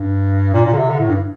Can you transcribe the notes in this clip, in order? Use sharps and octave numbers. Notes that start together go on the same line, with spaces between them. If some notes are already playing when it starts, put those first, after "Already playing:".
Already playing: G2
A#2
A#2
D3
C3
D3
A2
G2